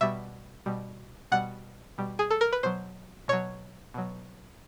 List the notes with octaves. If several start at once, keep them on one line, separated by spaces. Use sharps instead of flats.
B2 G3 E5
B2 G3
B2 G3 F#5
B2 G3
G#4
A4
A#4
B4
B2 F#3 C5
B2 F#3 C#5
B2 F#3